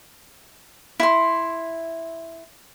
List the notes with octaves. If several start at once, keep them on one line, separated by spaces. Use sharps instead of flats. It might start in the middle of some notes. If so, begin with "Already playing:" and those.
E4 C6